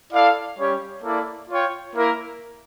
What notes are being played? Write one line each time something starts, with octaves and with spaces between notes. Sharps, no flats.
E4 A4 D5 F5
G3 C#4 G4 C#5
A#3 E4 A4 D5
F4 C#5 G5
A#3 E4 A#4